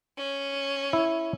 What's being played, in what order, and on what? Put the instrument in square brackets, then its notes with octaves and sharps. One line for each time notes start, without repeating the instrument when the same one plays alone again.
[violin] C#4
[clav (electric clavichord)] E4